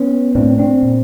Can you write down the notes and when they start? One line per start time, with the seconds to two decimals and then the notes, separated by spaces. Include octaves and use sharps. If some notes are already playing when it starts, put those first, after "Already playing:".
Already playing: B3 C#4
0.35 A2 C4 D4
0.58 C4 D4
0.82 A#2